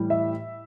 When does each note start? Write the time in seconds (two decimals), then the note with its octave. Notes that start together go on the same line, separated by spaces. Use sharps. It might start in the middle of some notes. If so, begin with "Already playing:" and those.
Already playing: A2 E3 G3
0.10 E5